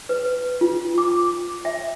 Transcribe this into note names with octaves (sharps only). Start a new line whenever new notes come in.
B4
F4
D6
E5